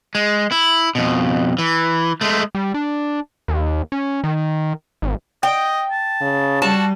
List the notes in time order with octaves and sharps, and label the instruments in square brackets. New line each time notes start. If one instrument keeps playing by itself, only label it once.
[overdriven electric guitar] G#3
E4
F2 B2
E3
G#3 A3
[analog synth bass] G3
D4
D#2
C#4
D#3
G#1
[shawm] D#5 [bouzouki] G5
[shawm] A5
[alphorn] C#3
[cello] G3 [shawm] F#4 [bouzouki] A5